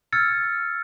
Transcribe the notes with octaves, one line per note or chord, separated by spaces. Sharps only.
E6 F6 G#6 A6 C#7